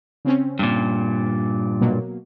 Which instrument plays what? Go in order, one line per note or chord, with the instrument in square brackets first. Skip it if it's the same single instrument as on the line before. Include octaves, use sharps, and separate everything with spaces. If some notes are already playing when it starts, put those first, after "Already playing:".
[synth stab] C#3 C4 C#4
[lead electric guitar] G2 A#2
[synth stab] B2 F#3 A#3